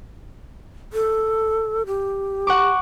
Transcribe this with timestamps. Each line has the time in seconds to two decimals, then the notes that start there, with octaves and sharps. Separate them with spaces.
0.93 A4
1.86 G4
2.47 F#5 C#6 D6